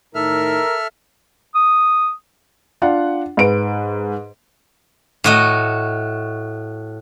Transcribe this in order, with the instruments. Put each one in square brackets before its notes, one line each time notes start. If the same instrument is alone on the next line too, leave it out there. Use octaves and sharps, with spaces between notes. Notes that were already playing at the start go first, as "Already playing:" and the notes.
[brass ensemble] A2 D#3 D#4 [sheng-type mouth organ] A4 E5 F6 [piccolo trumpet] A#4
[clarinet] D#6
[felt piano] D4 F4 F#5
G#2 B4 D7
[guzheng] A2 F#4 D#5